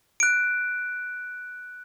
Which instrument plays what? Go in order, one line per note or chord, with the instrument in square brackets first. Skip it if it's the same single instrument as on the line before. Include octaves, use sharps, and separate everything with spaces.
[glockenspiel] F#6 D7